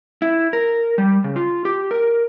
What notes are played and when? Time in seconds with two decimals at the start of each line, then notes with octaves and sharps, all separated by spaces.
0.22 E4
0.53 A#4
0.98 G3
1.24 C#3
1.36 F4
1.65 G4
1.91 A#4